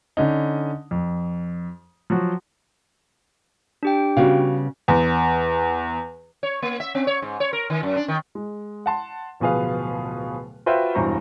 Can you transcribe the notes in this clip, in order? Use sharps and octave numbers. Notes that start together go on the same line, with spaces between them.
D3 C#4 D#4
F2
F3 F#3 F#4
D4 G4 G5
C#3 G3 B3 F#4 F5
E2
C#5
A#3
E5
C4
C#5
G#2
C#5
A#4
D#3
F#2
D4
D#3
G#3
F#5 A5 C6
D1 B2 F3 G#4 B4 F5
F4 F#4 B4 C5 E5 G5
E1 E2 G2 C5 A#5 C#6